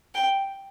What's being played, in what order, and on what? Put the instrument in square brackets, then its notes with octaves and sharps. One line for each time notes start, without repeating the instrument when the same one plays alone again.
[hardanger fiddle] G5